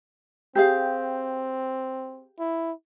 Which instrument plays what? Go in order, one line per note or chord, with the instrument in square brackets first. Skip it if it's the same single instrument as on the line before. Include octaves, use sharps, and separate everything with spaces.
[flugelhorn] C4 [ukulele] G4 G#4 F5
[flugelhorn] E4